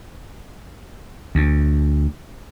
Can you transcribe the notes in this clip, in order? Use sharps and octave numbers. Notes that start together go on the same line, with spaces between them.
D2